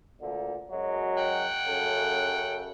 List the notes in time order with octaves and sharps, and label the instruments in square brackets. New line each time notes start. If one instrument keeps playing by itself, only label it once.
[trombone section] D2 A#2 D3
F#2 F#3 G#3
[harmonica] F#5 G5
[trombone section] F#2 C#3 A4